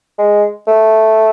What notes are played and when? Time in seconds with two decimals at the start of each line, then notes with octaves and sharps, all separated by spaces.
0.18 G#3
0.67 A3